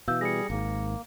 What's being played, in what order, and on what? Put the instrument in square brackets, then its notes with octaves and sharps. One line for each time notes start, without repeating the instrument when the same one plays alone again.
[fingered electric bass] B2 E3 [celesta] F5 E6 G6
[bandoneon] G3 G#4 [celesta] A#6 C#7
[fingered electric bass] G#1 G#2 [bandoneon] A#3